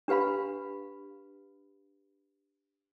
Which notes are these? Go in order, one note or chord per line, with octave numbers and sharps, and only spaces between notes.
D4 G4 B4 F5 B5